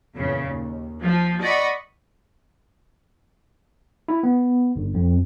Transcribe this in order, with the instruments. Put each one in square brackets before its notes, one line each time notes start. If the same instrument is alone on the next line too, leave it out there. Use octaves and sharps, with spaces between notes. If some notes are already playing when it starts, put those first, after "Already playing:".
[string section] E2 A#2 C#3
D#2
F3
D5 D#5 F#5 B5 C#6
[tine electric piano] E4
B3
G1
F2